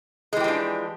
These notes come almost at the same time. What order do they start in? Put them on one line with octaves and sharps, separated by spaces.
G#3 E3 G4 F3 D4